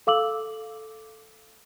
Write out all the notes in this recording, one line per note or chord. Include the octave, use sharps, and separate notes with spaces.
A4 F5 D6 E6 F#7